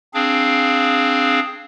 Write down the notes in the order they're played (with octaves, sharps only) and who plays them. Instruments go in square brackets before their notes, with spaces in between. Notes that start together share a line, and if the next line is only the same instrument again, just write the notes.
[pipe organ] C4 D4 G#4 F5